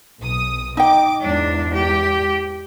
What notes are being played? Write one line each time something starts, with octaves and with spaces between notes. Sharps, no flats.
B1 D#6
D#4 D#5 G5 D6
E2 G#2 D4
G4